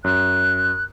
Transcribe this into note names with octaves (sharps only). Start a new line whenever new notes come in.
F#2 F#6